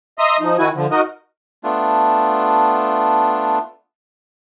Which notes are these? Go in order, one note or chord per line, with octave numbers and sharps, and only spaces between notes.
D#5 E5 A#5 C6 D#6
F3 D#4
D#3 E4 F#4 G#5
D3 F3
D#4 F#4 A#4 D#5
A3 B3 D4 F4